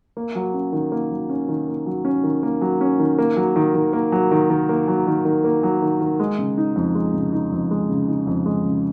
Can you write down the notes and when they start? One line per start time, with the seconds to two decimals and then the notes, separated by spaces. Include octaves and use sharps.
0.17 A#3
0.35 F#3
0.54 C#4
0.73 D#3
0.92 A#3
1.11 F#3
1.29 C#4
1.49 D#3
1.68 A#3
1.86 F#3
2.05 C#4
2.24 D#3
2.43 A#3
2.62 F#3
2.81 C#4
2.99 D#3
3.18 A#3
3.36 F#3
3.56 D#3
3.75 D#3
3.93 A#3
4.12 F#3
4.31 D#3
4.50 D#3
4.69 A#3
4.88 F#3
5.07 D#3
5.25 D#3
5.44 A#3
5.63 F#3
5.82 D#3
6.01 D#3
6.20 G#3
6.39 C#3
6.58 D#4
6.76 F2
6.95 G#3
7.14 C#3
7.33 D#4
7.52 F2
7.71 G#3
7.89 C#3
8.08 D#4
8.27 F2
8.46 G#3
8.65 C#3